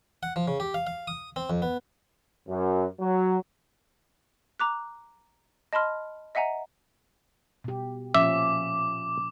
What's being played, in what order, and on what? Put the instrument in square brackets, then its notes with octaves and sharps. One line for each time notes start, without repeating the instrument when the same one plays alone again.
[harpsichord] F#5
F3
C#3
G4
F5
F5
D#6
C4
F2
B3
[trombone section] F#2
F#3
[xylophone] A#5 D6 F#6
D#5 A5 B5 C6 F6
D#5 E5 F#5 G#5 A#5
[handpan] B2 G4
[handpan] A#2 F3 C#4 [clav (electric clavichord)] E5 [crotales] D6